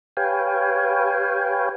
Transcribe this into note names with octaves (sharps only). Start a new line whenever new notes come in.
G4 B4 C#5 F5 G5 G#5